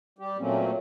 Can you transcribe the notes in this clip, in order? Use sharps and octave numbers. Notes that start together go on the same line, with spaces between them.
G3 G4
A#2 F#3 A3 A#3 C4 C#4